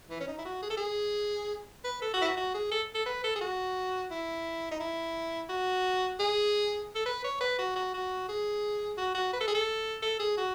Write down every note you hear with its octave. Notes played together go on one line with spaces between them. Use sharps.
E3
C#4
D#4
E4
F#4
G#4
A4
G#4
B4
A4
F#4
E4
F#4
F#4
G#4
A4
A4
B4
A4
G#4
F#4
E4
D#4
E4
F#4
G#4
A4
B4
C#5
B4
F#4
F#4
F#4
G#4
F#4
F#4
B4
A4
G#4
A4
A4
G#4
F#4